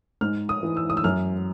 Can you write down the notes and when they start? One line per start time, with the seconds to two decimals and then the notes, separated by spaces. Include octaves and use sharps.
0.21 G#2 F6
0.49 D#6
0.63 E3
0.77 E6
0.90 D#6
0.97 E6
1.04 F#2 F6